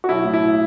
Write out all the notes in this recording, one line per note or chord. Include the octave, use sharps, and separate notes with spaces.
F#4
B1 E4
A2
E4